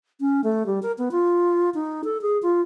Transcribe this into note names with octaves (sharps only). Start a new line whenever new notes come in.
C#4
A3
G3
A#4
B3
F4
D#4
A4
G#4
F4